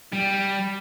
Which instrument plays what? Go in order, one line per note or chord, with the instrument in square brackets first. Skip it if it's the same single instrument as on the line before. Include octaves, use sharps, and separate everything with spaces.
[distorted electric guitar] G3